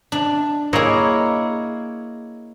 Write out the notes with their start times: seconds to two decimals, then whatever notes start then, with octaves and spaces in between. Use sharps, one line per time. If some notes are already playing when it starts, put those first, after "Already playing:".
0.12 D4
0.73 A#3 E4 G#4 C#5 D#5